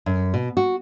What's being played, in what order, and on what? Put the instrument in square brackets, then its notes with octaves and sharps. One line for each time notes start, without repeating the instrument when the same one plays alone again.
[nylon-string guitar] F#2
B2
F#4